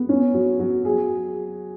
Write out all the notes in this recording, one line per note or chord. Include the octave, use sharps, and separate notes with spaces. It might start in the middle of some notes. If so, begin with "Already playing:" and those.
Already playing: B3
C#4
F#3
F#3
G#4